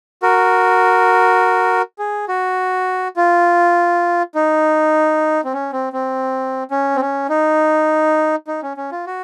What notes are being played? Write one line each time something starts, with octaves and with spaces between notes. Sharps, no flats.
F#4 A#4
G#4
F#4
F4
D#4
C4
C#4
C4
C4
C#4
C4
C#4
D#4
D#4
C#4
C#4
F4
F#4